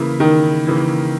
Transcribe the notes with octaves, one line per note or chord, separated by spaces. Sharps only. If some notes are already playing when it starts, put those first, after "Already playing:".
Already playing: C#3 E3 A#3 E4
D#3
C#3 E3 A#3 E4